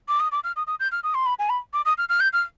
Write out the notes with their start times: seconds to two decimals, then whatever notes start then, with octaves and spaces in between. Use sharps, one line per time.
0.08 D6
0.20 D#6
0.32 D6
0.44 F6
0.56 D#6
0.67 D#6
0.80 G6
0.92 F6
1.03 D#6
1.14 C6
1.26 B5
1.39 G#5
1.49 B5
1.73 D6
1.85 D#6
1.98 F6
2.09 F6
2.20 G6
2.33 F6